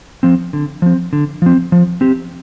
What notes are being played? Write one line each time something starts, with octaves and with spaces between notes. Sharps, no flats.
F3 C4
D3
F3 C4
D3
F3 C4
F3
C4 G4